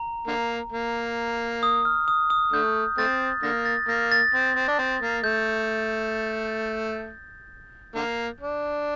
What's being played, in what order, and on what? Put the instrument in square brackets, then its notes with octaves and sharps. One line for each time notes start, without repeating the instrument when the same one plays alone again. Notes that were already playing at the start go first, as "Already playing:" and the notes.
Already playing: [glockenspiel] A#5
[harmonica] D3 A#3
A#3
[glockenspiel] D#6
F6
D#6
D#6
[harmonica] D3 A3 [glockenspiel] G6
[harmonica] A3 C4 [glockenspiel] A6
[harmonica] D3 A#3 [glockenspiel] A#6
[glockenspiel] A6
[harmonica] A#3 [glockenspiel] A#6
[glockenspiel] A6
[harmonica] C4
C4
D4
C4
A#3
[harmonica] A3 [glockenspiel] G6
[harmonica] D3 A#3
D4